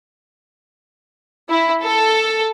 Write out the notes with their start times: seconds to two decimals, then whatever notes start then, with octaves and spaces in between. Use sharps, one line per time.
1.49 E4
1.82 A4